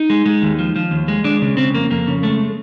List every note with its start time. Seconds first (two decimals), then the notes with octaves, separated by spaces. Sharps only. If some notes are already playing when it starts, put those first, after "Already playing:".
Already playing: D#4
0.10 G#3
0.26 G#3
0.42 D#2
0.59 F3
0.76 F3
0.91 D#2
1.08 G#3
1.24 G#3 D4
1.42 C#3
1.57 C#3 C4
1.73 F2 A#3
1.90 F2 A#3
2.07 C#3
2.23 G#3 A3